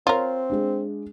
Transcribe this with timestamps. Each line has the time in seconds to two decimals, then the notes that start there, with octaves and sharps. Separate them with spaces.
0.07 C4 F4 A#4 C#5
0.50 G#3 D4